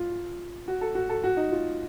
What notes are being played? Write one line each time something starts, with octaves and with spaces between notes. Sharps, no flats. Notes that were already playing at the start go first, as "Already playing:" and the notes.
Already playing: F4
F#4
A4
F#4
A4
F#4
D#4
F4